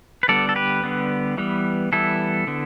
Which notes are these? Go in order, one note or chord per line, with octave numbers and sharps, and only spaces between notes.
B4
D3 G3 B3 A4 D5
A4
G4 B4
D3 G3 B3
E3 G3 B3
E3 G3 B3 E4 A4
D3 B3